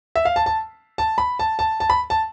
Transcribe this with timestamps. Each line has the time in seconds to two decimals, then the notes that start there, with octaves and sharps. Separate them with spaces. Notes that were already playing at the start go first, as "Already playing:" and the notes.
0.16 E5
0.25 F5
0.36 A5
0.46 A5
0.98 A5
1.18 B5
1.39 A5
1.59 A5
1.80 A5
1.90 B5
2.10 A5